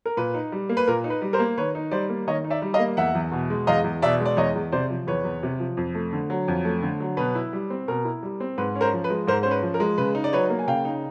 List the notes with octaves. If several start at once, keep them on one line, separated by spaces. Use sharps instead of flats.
A#4
A#2 B4
D#4
G3
A#3
B4
A#2 A#4
D#4
B4
G3
A#4 C5
A#3
D#3 B4 C#5
D#4
G3 C5 D5
A#3
D#3 C#5 D#5
D#4
D5 E5
G3
D#5 F5
A#3
E2 E5 F#5
E2
B2
G#3
E2 D#5 F5
E2
B2 D5 E5
G#3
D5
E2 C#5 D#5
E2
C3 C5 D5
F3
E2 B4 C#5
E2
C3
F3
F2
A3
D3
F#3
F2
A3
D3
F#3
B2 B4
E4
G3
C4
B2 A#4
E4
G3
C4
G#2 B4
C#4
A#4 C5
F3
B4
G#3
G#2 A#4 C5
C#4 C5
B4
F3
A#4
G#3
C#3 B4
D#4
D5
F#3 B4 C#5
A#3
G#5
C#3 F5 G5
D#4